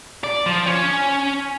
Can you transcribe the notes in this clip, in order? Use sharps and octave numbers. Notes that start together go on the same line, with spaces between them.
D5
F3
C#4